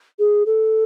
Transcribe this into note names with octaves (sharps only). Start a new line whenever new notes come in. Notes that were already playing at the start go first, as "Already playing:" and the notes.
G#4
A4